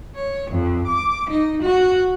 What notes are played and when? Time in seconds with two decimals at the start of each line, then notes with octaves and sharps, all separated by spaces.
0.16 C#5
0.51 F2
0.88 D6
1.30 D#4
1.63 F#4